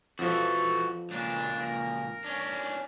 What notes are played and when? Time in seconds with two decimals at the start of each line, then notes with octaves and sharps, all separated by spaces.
0.19 F2 E3 F3 F#4 A4
1.10 C#2 A#2 D4
1.61 A#4
2.24 C#4 D4